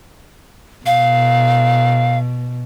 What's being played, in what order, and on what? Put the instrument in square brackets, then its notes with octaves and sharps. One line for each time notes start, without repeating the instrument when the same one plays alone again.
[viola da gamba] B2 [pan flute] F5